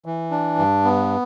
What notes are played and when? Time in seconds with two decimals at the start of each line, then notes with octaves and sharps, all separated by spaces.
0.06 E3
0.31 D4
0.58 G2
0.85 B3